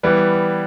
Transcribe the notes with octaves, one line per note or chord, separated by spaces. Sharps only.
E3 G3 B3